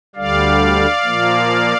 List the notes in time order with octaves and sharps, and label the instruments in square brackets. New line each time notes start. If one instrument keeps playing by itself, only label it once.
[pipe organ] D2 D3 G3 D5 F5
A#2 F3 A#3